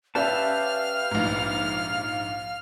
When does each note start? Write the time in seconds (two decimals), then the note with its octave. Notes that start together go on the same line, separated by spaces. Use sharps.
0.15 C#4 G4 B4 D5 E5 F5 A5 F6
1.11 A#1 G#2